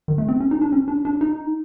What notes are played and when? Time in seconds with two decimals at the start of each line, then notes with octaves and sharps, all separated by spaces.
0.08 D#3
0.18 A3
0.28 C4
0.40 C#4
0.51 D#4
0.62 D4
0.72 C#4
0.88 D4
1.05 D4
1.21 D#4